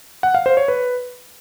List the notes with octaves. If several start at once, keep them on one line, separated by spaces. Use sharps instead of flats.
F#5
F5
C5
C#5
B4